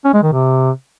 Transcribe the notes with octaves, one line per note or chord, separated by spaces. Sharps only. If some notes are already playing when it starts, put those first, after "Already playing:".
C#4
G#3
D#3
C3